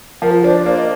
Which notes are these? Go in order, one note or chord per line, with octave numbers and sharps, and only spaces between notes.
F3 A#4
F4
D4 C5
D5
A#3 C5
D#5